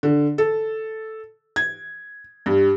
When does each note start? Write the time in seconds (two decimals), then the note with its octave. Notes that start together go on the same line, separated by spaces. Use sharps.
0.03 D3
0.38 A4
1.56 G#6
2.46 G2